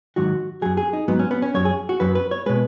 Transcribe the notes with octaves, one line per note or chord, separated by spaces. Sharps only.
G#2 D#3 F#3 F#4
F#2 F#3 G#4
G#4
D#4
G#2 F#3 B3
C#4
B3
C#4
F#2 F#3 C#5
G#4
F#4
F#2 F#3 B4
B4
C#5
B2 G#3 B4